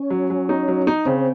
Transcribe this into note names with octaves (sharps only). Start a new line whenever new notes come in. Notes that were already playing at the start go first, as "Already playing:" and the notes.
Already playing: C#4
F#3
F#3
D#4
F#3
D#4
C#3 C4